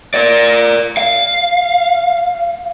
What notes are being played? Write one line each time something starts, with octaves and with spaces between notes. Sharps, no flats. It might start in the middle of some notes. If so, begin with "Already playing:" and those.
A#4 D5
F5